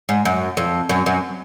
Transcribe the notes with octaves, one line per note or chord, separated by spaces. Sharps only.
G#2
F#2
F2
F#2
F#2